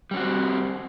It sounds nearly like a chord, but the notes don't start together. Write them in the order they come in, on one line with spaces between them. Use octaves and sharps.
G3 C#4 F#4 C4